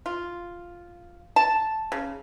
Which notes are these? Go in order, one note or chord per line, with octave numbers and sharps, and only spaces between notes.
F4
A5
C#3